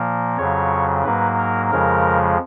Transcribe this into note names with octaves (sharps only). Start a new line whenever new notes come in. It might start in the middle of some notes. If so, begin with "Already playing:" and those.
Already playing: A#2 F3 A#3
F2 C#3 F#3 C#5
G#2 F#3 A#3 B4
A#4
F2 C#3 F3 G#3 A#4